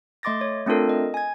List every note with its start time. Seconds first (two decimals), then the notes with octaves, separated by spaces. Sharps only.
0.23 A3 D#5 C6 D6 A6 A#6
0.41 C#5
0.67 A3 C4 D4 F4 A4 A#4
0.89 D#5
1.14 G#5 G#6